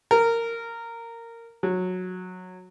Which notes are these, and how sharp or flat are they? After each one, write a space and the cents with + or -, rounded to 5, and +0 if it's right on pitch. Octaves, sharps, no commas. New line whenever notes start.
A#4 -15
F#3 -15